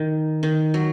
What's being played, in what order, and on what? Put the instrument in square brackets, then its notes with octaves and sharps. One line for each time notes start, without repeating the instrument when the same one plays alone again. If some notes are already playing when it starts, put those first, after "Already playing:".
Already playing: [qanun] D#3
D#3
F#3